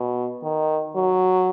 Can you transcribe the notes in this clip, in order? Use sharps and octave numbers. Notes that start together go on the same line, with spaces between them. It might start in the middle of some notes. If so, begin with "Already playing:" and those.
Already playing: B2
D#3
F#3